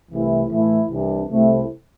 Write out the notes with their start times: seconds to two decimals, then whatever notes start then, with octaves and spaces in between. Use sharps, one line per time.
0.11 C2 C3 E3 A3 E4
0.50 A2 E3 A3 E4
0.89 C2 C3 E3 G3 D4
1.28 C2 C3 A3 C4 E4